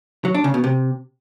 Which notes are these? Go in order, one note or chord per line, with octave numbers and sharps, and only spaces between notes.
F#3
D4
C#3
B2
C3